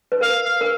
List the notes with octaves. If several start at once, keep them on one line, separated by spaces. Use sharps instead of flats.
B4
A#4 F5
F5
A#4